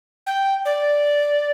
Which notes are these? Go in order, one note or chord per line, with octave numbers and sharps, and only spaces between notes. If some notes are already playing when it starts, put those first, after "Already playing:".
G5
D5